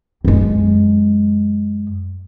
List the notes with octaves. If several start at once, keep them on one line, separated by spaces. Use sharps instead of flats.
F#2 G#3